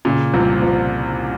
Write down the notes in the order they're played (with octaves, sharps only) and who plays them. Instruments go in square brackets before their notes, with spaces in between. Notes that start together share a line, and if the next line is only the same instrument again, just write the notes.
[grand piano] A#2 [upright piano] C#3
[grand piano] C2 C3 [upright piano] F3
[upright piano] F3